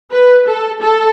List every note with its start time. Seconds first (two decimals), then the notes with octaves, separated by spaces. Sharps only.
0.12 B4
0.47 A4
0.81 A4